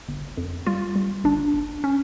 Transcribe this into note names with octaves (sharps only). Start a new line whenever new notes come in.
G1
F2
G3 F4
G3
G1 D4
G1
C#4